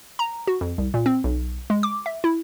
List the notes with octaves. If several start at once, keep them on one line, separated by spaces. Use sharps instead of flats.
A#5
F#4
F2
C2
A#2
C4
B1
G#3
D6
E5
E4